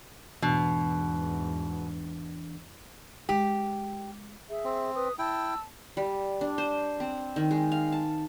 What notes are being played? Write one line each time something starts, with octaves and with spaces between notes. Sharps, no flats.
E2 G#2 B2 E3 D4
G#3 G4
G#4 E5
C4
B4 D#6
E4 G5 A5 E6
G3
D4
C5
C4
D#3
G#3
F5
A5